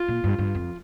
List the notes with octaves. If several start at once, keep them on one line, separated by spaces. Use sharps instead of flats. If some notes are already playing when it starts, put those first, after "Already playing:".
Already playing: F4
A#2
G2
G2
F2